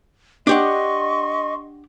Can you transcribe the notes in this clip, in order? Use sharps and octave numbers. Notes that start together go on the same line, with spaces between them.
D4 G4 D#5 F#5 C6 C#6